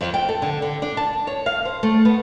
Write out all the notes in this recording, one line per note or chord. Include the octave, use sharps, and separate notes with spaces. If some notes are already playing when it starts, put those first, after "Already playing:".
F2
G5
A4
D3
D3
D4
A5
C#5
F5
C5
A3
B3